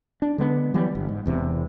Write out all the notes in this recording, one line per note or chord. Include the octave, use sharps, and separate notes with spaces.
D4
D3 G#3 B3
E3 F#3 G3 B3
G1
G#2
E1 E2 C3 G#3